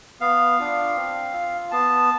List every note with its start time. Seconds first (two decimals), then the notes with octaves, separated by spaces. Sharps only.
0.20 B3 F5
0.59 D4 F4
0.95 C4
1.34 F4
1.71 B3 A5